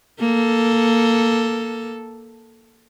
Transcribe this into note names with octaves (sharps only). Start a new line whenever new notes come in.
A#3 A4